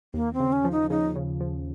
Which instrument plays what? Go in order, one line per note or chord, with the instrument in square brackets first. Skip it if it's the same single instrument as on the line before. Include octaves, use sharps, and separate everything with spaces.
[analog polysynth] D#2 [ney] A#3
[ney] C4
[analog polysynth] C#3
[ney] C#4
[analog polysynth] F3
[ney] D#4
[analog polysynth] C#3 [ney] D#4
[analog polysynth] C#3
F3